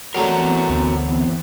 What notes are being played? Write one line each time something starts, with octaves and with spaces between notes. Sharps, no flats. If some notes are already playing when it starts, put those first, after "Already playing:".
E3 F#3 G3 A3 B3 C4 F#4 A#4
G1 D2 D4